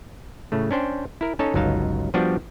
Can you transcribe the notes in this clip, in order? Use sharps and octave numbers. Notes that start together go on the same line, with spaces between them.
A2 C#3 A3
C#4 D4 C5 G5
E4 A#4
C#4 D#4 A4 C#5 D#5 A5
G1 C#2 F#3 D#4 F5 A5
F3 G3 B3 D4 F#4